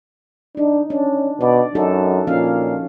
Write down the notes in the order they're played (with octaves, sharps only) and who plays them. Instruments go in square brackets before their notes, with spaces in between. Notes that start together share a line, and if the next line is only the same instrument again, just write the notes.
[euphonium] D4 [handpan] D#4
[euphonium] C#4 [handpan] D4
[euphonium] B2 [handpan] D5
[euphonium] F#2 [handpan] D#4 F#4 A4
[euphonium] A#2 [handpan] F3 C#4 F5